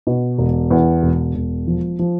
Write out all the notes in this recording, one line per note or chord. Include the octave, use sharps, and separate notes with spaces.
B2
E1
E2
E1
E1
F3
F3